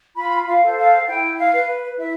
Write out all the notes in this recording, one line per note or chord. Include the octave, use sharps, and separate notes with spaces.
F4 B5
F5
A4 C5
F5
E4 G5
F5
B4
E4 E5